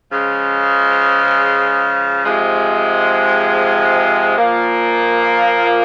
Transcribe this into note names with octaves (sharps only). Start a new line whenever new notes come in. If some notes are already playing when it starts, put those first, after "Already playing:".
C#3 F3 G#3
C3 F3 G#3
A#2 F3 A#3